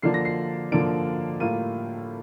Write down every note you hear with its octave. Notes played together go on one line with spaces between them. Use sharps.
D3 F3 A#3 D4 C7
A#6
C7
D3 F3 A#3 D4 D7
A2 G3 A#3 F4 D#7